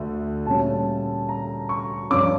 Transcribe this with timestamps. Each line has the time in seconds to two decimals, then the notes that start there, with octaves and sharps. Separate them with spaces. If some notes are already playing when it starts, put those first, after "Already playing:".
Already playing: D2 D3 A3
0.46 A#2 G3 C#4 A5
1.29 A#5
1.69 C#6
2.10 G2 F3 C#4 D6